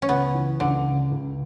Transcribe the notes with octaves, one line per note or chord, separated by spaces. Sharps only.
C#4
C#2 B3
E3
C#2 D3
C#3
C#2